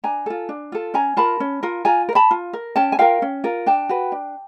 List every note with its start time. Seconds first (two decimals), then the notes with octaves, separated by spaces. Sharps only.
0.04 D4 G#5 A#5
0.26 F4 A4
0.49 D4
0.72 F4 A4
0.94 C#4 G#5 A#5
1.17 F4 A#4 A5 B5
1.40 C#4
1.63 F4 A#4
1.85 F4 G#5 A#5
2.09 A#4
2.15 A5 B5
2.31 F4
2.53 A#4
2.76 C#4 G5 A5
2.92 G#5
2.99 F4 A#4 F5 G5
3.22 C#4
3.44 F4 A#4
3.66 D4 G5 A5
3.89 F#4 B4
4.12 D4